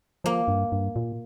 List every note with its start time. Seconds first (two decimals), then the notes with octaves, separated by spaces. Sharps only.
0.24 F3 A#3
0.48 G2
0.72 G2
0.96 A#2